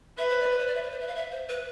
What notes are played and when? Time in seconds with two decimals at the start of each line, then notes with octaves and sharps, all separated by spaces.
0.18 B4 E5
0.30 C5
0.40 D5
0.52 B4
0.59 C5
0.67 D5
0.75 E5
0.83 B4
0.91 C5
1.00 E5
1.08 F5
1.15 E5
1.32 C5
1.49 B4